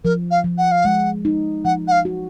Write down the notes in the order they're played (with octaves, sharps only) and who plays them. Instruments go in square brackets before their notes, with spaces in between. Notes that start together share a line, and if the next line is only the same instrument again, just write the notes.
[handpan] F3 [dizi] A#4
[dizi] F5
[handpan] F3
[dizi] F#5
F5
[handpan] G#3 [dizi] F#5
[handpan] D#4
[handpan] F3 [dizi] F#5
[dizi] F#5
F5
[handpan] F#4